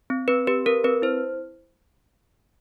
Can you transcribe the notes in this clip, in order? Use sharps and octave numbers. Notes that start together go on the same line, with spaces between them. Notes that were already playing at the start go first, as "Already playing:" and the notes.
C4
C4 B4
G4 B4
C4 A#4
C4 B4
E4 C5